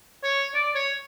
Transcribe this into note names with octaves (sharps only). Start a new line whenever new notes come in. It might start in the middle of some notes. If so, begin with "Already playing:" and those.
C#5
D5
C#5